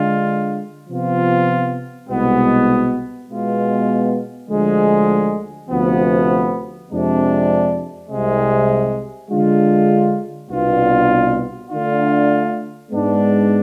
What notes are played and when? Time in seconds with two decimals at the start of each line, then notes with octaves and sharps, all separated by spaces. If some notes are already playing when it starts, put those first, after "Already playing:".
Already playing: D3 G#3 D4 F4
0.88 C3 F3 B3 F4
2.09 C2 B2 G#3 B3
3.30 B2 G#3 B3 F4
4.49 D2 D3 F3 G#3
5.69 D2 C3 F3 B3
6.90 F2 C3 G#3 D4
8.10 C2 C3 G#3
9.30 D3 G#3 D4 F4
10.50 C2 B2 B3 D4 F4
11.70 D3 A3 D4 F4
12.91 G#2 G#3 B3 D4